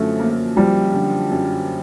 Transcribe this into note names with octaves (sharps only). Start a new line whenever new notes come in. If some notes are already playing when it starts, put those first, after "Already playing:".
Already playing: F#2 D3 F3 A3
A#3
F3 G3
D3
F#2